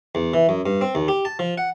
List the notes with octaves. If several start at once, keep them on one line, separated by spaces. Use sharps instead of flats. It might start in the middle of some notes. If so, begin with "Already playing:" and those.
E2
E3
F#2
G2
C4
D#2
G4
A5
F3
F#5